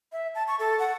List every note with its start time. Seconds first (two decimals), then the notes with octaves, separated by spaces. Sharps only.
0.12 E5
0.35 A5
0.48 C#6
0.59 A4
0.79 F#5